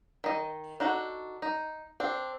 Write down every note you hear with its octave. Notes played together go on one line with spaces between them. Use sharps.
D#3 D#5
D4 D#4 F#4 A4
D#4
C4 D4